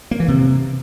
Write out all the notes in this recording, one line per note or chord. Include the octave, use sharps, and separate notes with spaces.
A#3
E3
C3